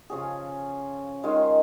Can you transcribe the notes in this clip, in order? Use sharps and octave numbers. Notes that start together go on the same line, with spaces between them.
C#3 F3 C#4 G#4
D#3 G#3 F4 G#4